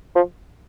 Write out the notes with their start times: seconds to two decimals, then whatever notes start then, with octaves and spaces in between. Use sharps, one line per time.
0.15 F3